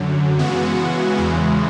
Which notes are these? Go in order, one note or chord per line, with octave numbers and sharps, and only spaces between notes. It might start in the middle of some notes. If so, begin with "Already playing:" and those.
Already playing: F#2 D3 F#3
C#3 E3 G#3 B3 F#4
E2 C#3 E3 G#3